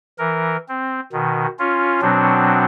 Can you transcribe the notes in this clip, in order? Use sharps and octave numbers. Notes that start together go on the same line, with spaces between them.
E3 A#4
C4
B2 D#3
C#4 F4
B2 F#3 C4 D4